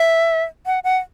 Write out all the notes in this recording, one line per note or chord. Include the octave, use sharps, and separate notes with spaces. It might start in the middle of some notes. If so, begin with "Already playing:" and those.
Already playing: E5
F#5
F#5